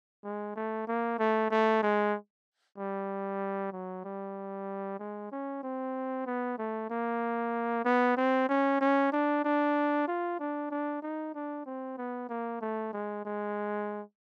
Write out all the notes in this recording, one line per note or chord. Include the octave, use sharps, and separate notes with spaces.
G#3
A3
A#3
A3
A3
G#3
G3
F#3
G3
G#3
C#4
C4
B3
A3
A#3
B3
C4
C#4
C#4
D4
D4
F4
D4
D4
D#4
D4
C4
B3
A#3
A3
G#3
G#3